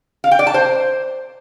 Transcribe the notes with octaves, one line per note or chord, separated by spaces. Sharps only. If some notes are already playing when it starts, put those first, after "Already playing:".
F5
G5
D5
A5
C5